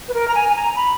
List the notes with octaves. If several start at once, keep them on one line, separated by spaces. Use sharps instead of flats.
B4
A#4
A#5
G#5
G#5
A#5
B5